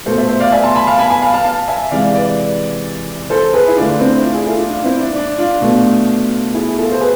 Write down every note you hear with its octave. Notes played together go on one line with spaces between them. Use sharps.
B2 A3 A4 C5
C5 E5
C5 E5
D5 F5
E5 G#5
A5 C6
G#5 B5
F5 A5
G#5 B5
G#5 B5
F5 A5
F5 A5
F5 A5
E5 G#5
C3 E3 G#3 D5 F5
B4 D5
A4 C5
G#4 B4
E4
D3 A3 D4 F4
C4 E4
D4 F4
E4 G#4
F4 A4
D4 F4
D4 F4
C4 E4
D4
D4
D4 F4
B2 A3
E4 G#4
F4 A4
C5
G#4 B4